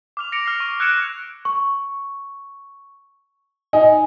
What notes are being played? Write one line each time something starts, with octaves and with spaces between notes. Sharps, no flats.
D6 F6 F7
A#6 C#7 D7 F7
F6 C7
C#6
E6 F#6 G#6 C#7 D7 E7
C#6
D#4 G#5